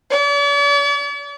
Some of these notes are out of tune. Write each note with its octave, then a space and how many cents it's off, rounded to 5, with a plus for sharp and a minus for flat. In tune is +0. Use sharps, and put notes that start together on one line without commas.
D5 -45